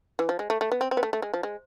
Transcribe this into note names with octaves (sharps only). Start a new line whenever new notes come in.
E3
F3
G#3
A3
A3
B3
C4
C4
B3
A3
A3
G#3
F3
G#3